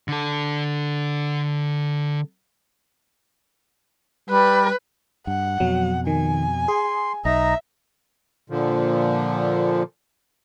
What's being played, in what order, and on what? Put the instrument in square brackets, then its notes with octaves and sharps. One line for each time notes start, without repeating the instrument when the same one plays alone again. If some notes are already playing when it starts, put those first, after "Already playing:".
[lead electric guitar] D3 A4
[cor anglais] G3 [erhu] B4
[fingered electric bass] G2 [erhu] F#5
[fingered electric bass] F2 B2 [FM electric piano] F#3
[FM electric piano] D#3 [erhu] G#5
[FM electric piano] G#4 [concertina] C6
[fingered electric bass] B1 [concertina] D#4 D#5 A#5 [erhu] E5
[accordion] A#2 D3 F3